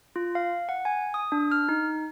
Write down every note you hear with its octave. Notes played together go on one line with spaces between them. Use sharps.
F4
F5
F#5
G#5
D#6
D4
F6
D#4